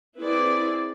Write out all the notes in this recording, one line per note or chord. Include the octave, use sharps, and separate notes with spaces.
C4 E4 G#4 B4 D5